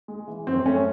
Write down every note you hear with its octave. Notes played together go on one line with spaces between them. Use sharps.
G#3
E3
F#2 C4
A3 C#4